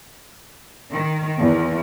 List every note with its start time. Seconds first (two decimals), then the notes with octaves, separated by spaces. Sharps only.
0.90 D#3
1.39 E2